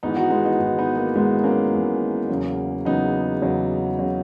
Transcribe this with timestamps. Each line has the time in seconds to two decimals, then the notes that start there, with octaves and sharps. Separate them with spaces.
0.03 G#1 G#2 E3 B3 D#4
0.16 D#4 F#4
0.30 G#3 B3
0.45 B3 D#4
0.59 G#1 G#2 E3
0.79 B3 D#4
0.97 A#3
1.15 G#1 G#2 E3 G#3 B3
1.44 A#3 C#4
1.73 G#1 G#2 E3
2.29 E2 C#3 F#3
2.85 E2 C#3 F#3 B3 D#4
3.42 E2 C#3 F#3
3.99 C#3 F#3